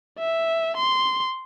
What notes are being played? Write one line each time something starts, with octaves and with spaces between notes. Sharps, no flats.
E5
C6